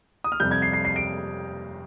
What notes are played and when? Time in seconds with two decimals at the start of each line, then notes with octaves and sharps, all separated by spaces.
0.24 D#6
0.32 F6
0.40 F2 C3 G3 G6
0.51 G#6
0.62 C7
0.73 C7
0.85 C7
0.96 D7